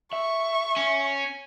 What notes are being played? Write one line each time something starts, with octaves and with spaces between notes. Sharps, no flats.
E5 C#6
C#4